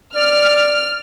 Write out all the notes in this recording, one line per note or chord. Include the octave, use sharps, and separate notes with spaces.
D5 F6